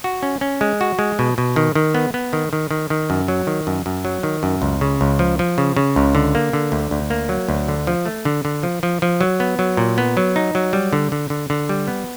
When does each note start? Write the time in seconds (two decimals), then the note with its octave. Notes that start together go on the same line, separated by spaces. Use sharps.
0.04 F#4
0.23 C#4
0.41 C#4
0.61 G#3
0.81 F#4
0.99 G#3
1.19 B2
1.38 B2
1.56 D#3
1.75 D#3
1.95 B3
2.14 B3
2.33 D#3
2.53 D#3
2.71 D#3
2.90 D#3
3.10 F#2
3.28 F#3
3.47 D#3
3.67 F#2
3.86 F#2
4.05 F#3
4.23 D#3
4.43 F#2
4.62 C#2
4.81 C#3
5.01 C#2
5.19 F3
5.39 F3
5.58 C#3
5.77 C#3
5.96 C#2
6.15 D3
6.35 A#3
6.53 D3
6.72 D2
6.91 D2
7.10 A#3
7.29 F#3
7.49 D2
7.68 D3
7.87 F3
8.06 A3
8.25 D3
8.45 D3
8.63 F3
8.83 F3
9.02 F3
9.21 F#3
9.40 B3
9.59 F#3
9.77 A#2
9.98 B3
10.17 F#3
10.36 D#4
10.55 F#3
10.73 G3
10.93 D3
11.12 D3
11.30 D3
11.50 D3
11.69 G3
11.88 B3